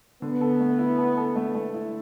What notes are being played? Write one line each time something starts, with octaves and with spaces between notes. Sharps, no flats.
D3 B3
A4
A3
E4
A4
A4
A3
A3
E4